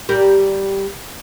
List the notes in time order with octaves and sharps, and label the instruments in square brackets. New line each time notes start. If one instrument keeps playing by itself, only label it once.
[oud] G3 G4 A#4